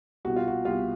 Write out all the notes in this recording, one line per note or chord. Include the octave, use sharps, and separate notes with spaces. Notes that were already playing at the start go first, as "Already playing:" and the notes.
C2 B2 F#4
F4
F#4
C2 B2 F4